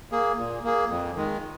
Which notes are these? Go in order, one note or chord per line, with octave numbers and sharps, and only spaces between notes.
A#3 G#4
A#2
A#3 G#4
F2
D#3 G#3